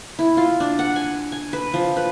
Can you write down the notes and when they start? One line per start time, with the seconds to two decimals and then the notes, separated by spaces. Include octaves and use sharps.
0.19 E4
0.37 F4
0.60 D4
0.79 F#5
0.96 G#5
1.32 G#5
1.53 B4
1.74 F3
1.97 B4